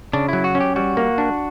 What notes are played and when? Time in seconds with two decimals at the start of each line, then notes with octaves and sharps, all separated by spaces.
0.13 C#3 D4
0.29 F#3 E4
0.44 F#4
0.55 C#4
0.60 G4
0.76 G3 F#4
0.97 A#3
1.18 D4